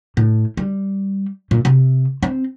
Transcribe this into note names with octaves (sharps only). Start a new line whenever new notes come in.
A2
G3
A#2
C3
C4